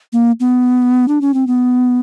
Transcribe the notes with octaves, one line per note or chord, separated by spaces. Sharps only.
A#3
B3
D4
C#4
C4
B3